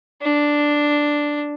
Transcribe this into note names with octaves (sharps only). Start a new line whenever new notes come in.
D4